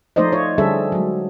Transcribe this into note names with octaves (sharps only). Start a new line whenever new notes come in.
F3 A3 D#4 C5 D5 D#5
F4 C#5
D3 G3 C#4 G#4 A4 E5
F#3 G#3